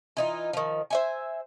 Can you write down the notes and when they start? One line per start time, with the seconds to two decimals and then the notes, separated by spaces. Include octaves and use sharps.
0.17 E3 D#4 F4
0.53 D#3 F3
0.90 C5 E5 G#5